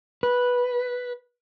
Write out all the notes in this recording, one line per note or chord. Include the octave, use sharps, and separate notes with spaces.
B4